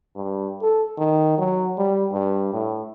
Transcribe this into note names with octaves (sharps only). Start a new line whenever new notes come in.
G2
A4
D#3
F#3
G3
G2
A2